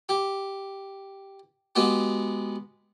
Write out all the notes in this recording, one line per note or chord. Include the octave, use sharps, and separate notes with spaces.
G4
G#3 B3 F#4 G4